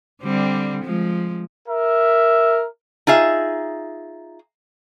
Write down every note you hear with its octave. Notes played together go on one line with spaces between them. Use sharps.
D3 G3 C4
F3 G#3
A#4 E5
D#4 F4 G#4 E5